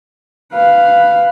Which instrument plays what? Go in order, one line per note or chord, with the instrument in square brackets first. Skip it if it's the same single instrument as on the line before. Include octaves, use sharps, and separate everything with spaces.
[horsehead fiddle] B4 F5